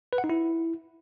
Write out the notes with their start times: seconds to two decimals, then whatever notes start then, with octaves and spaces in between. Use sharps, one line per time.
0.13 B4
0.18 F#5
0.24 D#4
0.30 E4